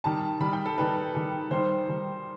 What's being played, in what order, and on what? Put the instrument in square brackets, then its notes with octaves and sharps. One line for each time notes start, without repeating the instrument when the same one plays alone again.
[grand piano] D#3 G3 D#4 A5
D#3 G3 D#4 B5
G5
A4
D#3 G3 D#4 B4
D#3 G3 D#4
D#3 G3 D#4 C5
D#3 G3 D#4